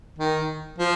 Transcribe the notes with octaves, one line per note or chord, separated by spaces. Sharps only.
D#3
F3